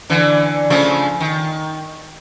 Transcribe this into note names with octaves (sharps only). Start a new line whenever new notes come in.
D3 E3
C#3 F3 A3
D#3